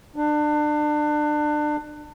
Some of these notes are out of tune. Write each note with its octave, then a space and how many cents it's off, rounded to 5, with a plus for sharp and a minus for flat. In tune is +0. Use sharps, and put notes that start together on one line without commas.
D4 +30